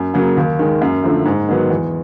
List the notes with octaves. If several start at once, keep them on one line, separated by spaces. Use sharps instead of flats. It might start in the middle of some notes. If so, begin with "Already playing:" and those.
Already playing: F#2
C#3 F#3 A#3
D#2
D#3 G#3
F#2
D3 F3 A3
G#2
D#3 F#3 B3
E2